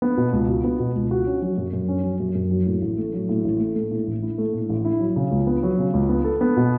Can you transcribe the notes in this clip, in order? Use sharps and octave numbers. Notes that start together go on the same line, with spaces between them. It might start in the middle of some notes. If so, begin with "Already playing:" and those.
B3
B2
C#2
F#4
B3
B2
C#2
F#4
C#4
F#3
F#2
F#2
C#4
F#3
F#2
F#2
F#3
A2
A1
A3
F#3
A2
A1
A3
A3
A2
A1
E4
A3
A2
A1
E4
F#3
C#3
C#2
B3
F#3
C#3
C#2
B3
A4
B3
B2